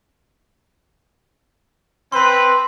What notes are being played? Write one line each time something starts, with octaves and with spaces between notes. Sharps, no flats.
C4 B4 B5 C6